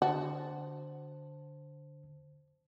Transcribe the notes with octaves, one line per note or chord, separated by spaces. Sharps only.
D3 F#4 C5 A5